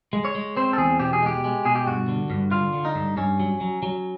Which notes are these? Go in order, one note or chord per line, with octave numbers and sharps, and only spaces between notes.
G#3
C#5
G#3
C4 C5
A4
E2 G#4
B2 G4
G#4
G#3 G4
G#3
B2 G#4
G4
G2 F#4
D3
G2
D3 F4
D3
D#4
G2
G2 C#4
F#3
F#3
F#3